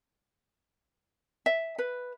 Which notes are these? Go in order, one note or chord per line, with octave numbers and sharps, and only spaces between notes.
E5
B4